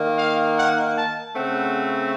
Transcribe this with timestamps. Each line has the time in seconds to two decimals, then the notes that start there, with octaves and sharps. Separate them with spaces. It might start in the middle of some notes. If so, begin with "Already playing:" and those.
Already playing: D#3 A#3
0.17 F5
0.57 F#5
0.95 A5
1.35 C#3 A3 C4 F#5